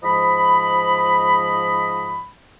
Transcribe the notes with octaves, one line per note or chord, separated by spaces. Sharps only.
G#2 F3 D#5 B5